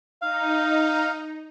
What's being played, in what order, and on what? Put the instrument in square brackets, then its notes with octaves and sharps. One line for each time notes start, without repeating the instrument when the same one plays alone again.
[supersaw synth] D#4 [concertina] F5